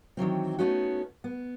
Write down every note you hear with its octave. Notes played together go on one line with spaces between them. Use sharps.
D#3 E3 F#3 C4
A3 B3 C#4 D#4 F#4
B3